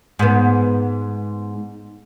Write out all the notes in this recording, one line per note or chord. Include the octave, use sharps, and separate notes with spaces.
G#2 B3